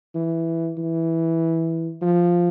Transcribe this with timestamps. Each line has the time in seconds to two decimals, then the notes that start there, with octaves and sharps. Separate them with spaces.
0.15 E3
0.78 E3
2.02 F3